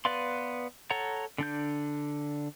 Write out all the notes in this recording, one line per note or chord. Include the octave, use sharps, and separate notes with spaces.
B3 B4 D5 F5 C6
A4 C#5 F#5 A#5
D3 D4 G6